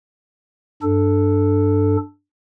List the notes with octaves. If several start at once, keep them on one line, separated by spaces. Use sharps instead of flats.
G2 D4 A4